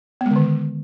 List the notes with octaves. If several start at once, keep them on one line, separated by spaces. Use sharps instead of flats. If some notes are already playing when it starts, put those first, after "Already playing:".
B3
G#3
D3
D#3